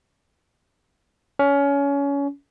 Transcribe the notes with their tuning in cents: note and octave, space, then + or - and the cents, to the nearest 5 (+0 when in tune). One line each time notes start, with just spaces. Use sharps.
C#4 +25